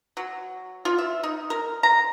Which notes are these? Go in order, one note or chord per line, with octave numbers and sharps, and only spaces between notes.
F#3
F4
E5
D#4
A#4
A#5